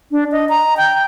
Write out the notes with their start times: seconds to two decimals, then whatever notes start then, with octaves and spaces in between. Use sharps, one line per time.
0.11 D4
0.32 D#5
0.49 A#5
0.77 G5